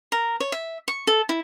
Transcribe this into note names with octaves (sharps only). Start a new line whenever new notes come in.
A#4
C#5
E5
C#6
A4
E4